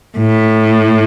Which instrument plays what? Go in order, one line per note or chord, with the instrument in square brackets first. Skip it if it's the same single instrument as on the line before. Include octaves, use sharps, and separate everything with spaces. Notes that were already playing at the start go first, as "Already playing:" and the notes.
[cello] A2